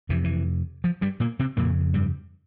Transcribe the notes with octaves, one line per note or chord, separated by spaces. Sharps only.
F2 C3 E3
E3
F3
G2 G3
A#2 A#3
C3 C4
F2 A#2 C#3 A#3
G2 G3